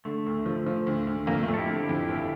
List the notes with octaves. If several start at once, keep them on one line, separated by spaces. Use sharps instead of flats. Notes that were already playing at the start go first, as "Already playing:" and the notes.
D3 A3
D2
F3
F3
D2
D2
F2 A#3
A3
F2
A4
E4 G4
D3
E4 G4
F2
G1